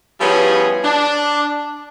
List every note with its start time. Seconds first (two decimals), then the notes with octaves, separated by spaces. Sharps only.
0.20 F3 G3 B3 C#4 E4 G#4
0.83 D4